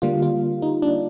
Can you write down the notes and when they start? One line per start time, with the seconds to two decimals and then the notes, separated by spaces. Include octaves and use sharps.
0.02 D3 G3 A#3 F4
0.22 F4
0.62 D#4
0.82 D4